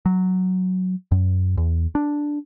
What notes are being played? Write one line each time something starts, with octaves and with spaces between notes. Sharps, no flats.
F#3
F#2
E2
D4